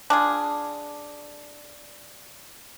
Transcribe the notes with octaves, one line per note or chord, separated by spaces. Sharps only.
D4 F4 G#4